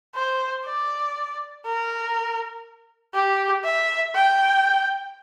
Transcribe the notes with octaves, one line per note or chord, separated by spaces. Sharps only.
C5
D5
A#4
G4
E5
G5